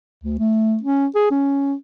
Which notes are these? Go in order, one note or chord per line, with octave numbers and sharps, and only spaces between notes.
D2
A3
C#4
G#4
C#4